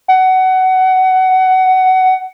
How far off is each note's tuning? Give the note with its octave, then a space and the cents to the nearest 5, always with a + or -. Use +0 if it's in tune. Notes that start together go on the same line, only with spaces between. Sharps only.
F#5 +20